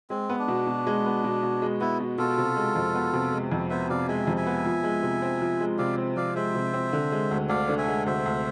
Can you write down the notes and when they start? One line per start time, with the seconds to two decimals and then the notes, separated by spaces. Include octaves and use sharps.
0.10 G#3 C4
0.29 B3
0.39 D4
0.48 B2
0.67 B2
0.87 G#3
1.06 B3
1.24 B2
1.43 B2
1.62 G#3
1.81 B3 E4
2.00 B2
2.18 B2 F4 A4
2.38 C3
2.56 G#3
2.76 F2
2.95 B3
3.13 C3
3.32 G#3
3.52 F2
3.70 B3 C5 E5
3.90 C3 D5 F5
4.08 G#3 E5 G#5
4.27 F2
4.37 E5 G#5
4.46 B3
4.65 F3
4.84 G#3
5.03 C3
5.22 C4
5.42 F3
5.61 G#3
5.78 C3 D5 F5
5.98 C4
6.16 F3 D5 F5
6.35 G#3 C5 E5
6.55 C3
6.74 C4
6.93 D3
7.12 G#3
7.31 D2
7.49 D2 D5 F5
7.69 D3
7.78 E5 G#5
7.88 G#3
8.06 D2 C5 E5
8.26 D2